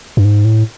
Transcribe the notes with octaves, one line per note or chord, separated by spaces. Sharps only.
G2
G#2
A2